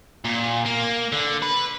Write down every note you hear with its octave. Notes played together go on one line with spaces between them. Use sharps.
A#2
A#3
D3
B4